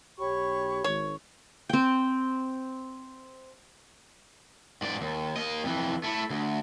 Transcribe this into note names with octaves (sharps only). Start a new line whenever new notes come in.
B1 G4 C#5 B5 C#6
G#1 C#5
C4 G5
G#2 D5
D#2
A#3 D#5
F2 E3
A3 E4
D2